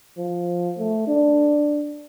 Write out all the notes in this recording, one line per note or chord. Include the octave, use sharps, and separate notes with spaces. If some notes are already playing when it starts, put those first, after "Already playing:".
F3
A3
D4